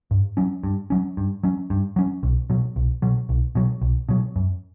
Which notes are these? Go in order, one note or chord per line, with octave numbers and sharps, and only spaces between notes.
G2
F#3 C#4
G2
F#3 C#4
G2
F#3 C#4
G2
F#3 C#4
B1
B2 F#3
B1
B2 F#3
B1
B2 F#3
B1
B2 F#3
F#2